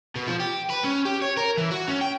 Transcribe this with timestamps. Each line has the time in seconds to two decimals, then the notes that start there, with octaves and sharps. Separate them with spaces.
0.16 B2
0.27 F3
0.40 G4
0.70 B4
0.84 C#4
1.05 G4
1.22 C#5
1.37 A#4
1.57 E3
1.71 F#4
1.88 C#4
2.01 G5